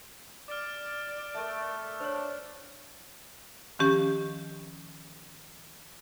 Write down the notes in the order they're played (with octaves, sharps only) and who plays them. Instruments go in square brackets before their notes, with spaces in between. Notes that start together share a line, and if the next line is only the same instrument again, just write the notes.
[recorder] D5 [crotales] D6 F6
[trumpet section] A3 [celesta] A#4 E5
[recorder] D4 [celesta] C5 C#5
[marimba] D#3 F3 C#4 G4